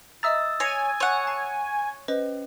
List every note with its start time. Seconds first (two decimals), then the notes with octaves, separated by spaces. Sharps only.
0.23 D#5 E5 A#5 D#6 E6 A6
0.60 C#5 G#5 A#6 C7 C#7
1.00 C#5 F#5 G6
1.27 A5 C7
2.08 C#4 B4 C5 D#5